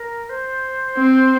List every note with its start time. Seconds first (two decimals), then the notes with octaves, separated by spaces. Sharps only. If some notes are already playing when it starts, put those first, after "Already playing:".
Already playing: A#4
0.29 C5
0.98 C4